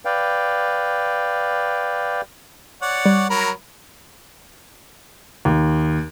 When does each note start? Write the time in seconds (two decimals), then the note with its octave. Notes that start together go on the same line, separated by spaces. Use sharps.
0.05 B4 D5 F5 G5
2.82 C#5 D5 F#5
3.06 G3
3.30 F#3 A#4 B5
5.45 D#2